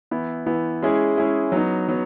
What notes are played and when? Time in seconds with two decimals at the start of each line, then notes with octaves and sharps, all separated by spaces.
0.11 E3 B3 E4
0.46 E3 B3 E4
0.82 G#3 C#4 E4 G#4
1.17 G#3 C#4 E4 G#4
1.52 F#3 B3 D#4
1.89 F#3 B3